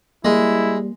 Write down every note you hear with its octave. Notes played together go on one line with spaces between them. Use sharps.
G3 G#3 A#3 E4